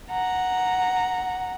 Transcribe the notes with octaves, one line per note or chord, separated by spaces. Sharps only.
F#5 A#5